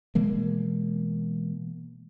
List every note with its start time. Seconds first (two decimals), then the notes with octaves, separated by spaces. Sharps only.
0.15 B2 E3 G#3 A#3